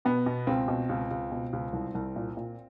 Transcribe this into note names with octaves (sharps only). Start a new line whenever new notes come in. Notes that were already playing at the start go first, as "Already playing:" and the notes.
B2 B3
B2
C#2 C4
B2
C#2
C#2
B2
C#2
C2
C2
A#2
A#2